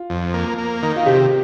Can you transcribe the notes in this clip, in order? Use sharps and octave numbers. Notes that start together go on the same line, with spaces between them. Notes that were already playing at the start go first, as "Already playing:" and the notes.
Already playing: F4
F2
A#3
A#3
D#3
F4
C3 G4